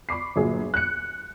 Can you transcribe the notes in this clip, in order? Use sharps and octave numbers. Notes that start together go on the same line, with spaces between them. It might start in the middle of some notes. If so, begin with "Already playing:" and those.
B5 C#6 D6 C7
G1 A#2 F#3 G#4
F#6 C#7